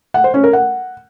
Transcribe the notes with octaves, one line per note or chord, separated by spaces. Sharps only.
F#5
C5
C#4
A#4
F#5